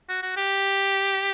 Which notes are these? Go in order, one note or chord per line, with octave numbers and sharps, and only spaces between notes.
F#4
F#4
G4